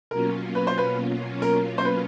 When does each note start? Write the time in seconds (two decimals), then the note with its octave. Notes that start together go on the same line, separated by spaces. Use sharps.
0.11 B2 F#3 A#3 C#4 F4 A#4
0.55 B4
0.67 C5
0.78 B4
1.42 A#4
1.78 C5
1.85 B4